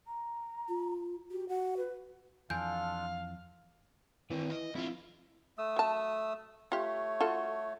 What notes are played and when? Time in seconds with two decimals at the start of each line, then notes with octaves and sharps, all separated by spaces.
0.07 A#5
0.68 F4
1.31 F#4 G4
1.49 F#4 F#5
1.77 B4
2.50 F2 E3 D4 F4 A4 F5 G#5 G6
4.30 D#3 E3 C4
4.50 D#5
4.75 F2 E4 F4
5.58 A3 D#6 E6
5.76 F#3 A5
6.72 A3 F4 G4 C#5
7.21 F4 F#4 A4